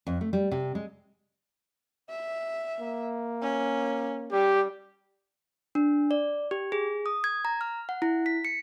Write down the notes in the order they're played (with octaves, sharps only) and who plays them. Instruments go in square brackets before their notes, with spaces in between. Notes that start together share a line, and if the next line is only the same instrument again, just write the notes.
[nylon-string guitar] F2
A3
G3
C3
G#3
[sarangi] E5
[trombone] A#3
[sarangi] C#4
[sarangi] G3 [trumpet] G4
[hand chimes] D4
D5
G4
G#4
D#6
G#6
A#5
F6
F#5
E4
B6
C#7